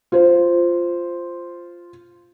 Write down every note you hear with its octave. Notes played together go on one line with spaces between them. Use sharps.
F4 C5